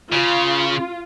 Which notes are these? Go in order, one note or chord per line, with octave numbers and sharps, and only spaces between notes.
C#3 F4